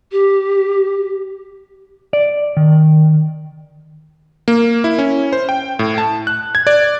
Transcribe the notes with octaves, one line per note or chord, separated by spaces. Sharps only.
G4
D5
D#3
A#3
E4
C#4
C5
G5
A2
A5
F#6
G#6
D5